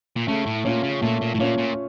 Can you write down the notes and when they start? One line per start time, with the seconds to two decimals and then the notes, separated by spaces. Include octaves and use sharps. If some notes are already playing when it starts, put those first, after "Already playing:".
0.16 A#2
0.28 C#3 A3
0.46 A2
0.65 A#2 C#4 F4
0.84 C#3
1.02 A#2 A3
1.21 A#2
1.34 A2
1.40 A#2 C#4 F4
1.58 A#2